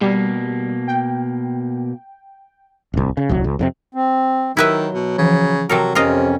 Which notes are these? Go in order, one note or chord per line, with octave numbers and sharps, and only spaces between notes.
B2 G3 A#3
G5
D1 C2
C#3
D#1 C2 F#3
C#2
F2 G#2 C3
C4
D#3 F#3 E4 G4 A#4 B4 E5
B2
C#3 E3 F3
C3 F#3 A4 A#4
F2 C3 C#4 F4 A#4 D#5